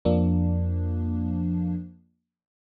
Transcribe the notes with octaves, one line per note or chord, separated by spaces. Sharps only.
F2 F3 A#3 D4